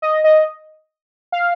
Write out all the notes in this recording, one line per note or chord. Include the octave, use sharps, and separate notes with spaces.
D#5
D#5
F5